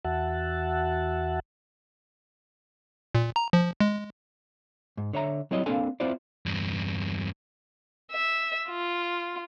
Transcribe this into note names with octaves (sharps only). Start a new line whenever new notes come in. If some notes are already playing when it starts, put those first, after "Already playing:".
E2 F#4 E5 F#5 A5
A#2
A#5
F3
G#3
G#2
D3 C#5 E5 A#5
F#3 G3 C4 E4 C#5 D#5
A#3 C4 D4 A4 F5 G#5
C4 E4 F4 B4 C5 D5
E2 G2
E5
F4